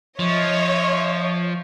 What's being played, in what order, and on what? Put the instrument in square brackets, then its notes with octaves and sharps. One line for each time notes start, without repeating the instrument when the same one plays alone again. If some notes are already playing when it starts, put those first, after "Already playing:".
[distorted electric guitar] F3 [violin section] C#5 D#5 E5